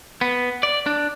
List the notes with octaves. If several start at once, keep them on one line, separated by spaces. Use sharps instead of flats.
B3
D5
D4